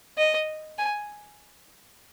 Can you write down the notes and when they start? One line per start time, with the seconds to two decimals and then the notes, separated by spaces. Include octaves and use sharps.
0.18 D#5
0.78 G#5